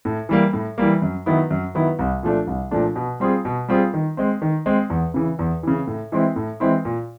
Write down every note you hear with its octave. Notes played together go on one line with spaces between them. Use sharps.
A2
E3 G3 A#3
A2
E3 G3 A#3
F#2
D#3 F#3 B3 E4
F#2
D#3 F#3 B3 E4
C2
A#2 F3 A3 D4
C2
A#2 F3 A3 D4
B2
G3 C4 F4 G#4
B2
G3 C4 F4 G#4
D#3
G#3 C4
D#3
G#3 C4
E2
C#3 E3
E2
C#3 E3
A2
E3 G#3 C4 E4
A2
E3 G#3 C4 E4
A#2